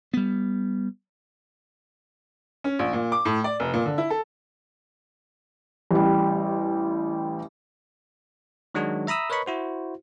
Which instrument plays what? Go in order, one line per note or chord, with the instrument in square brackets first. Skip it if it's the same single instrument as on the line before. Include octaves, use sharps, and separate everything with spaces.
[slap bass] G3 B3
[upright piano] C#4
A#1
A#2
D6
A2
D5
F1
A#2
D3
E4
A4
[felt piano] A1 G3
[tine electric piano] D#3 F#3 G#3 D4 F#4
E5 A#5 B5 D#6 E6
A#4 B4 C#5 D#5 B5 C#6
E4 F#4 C5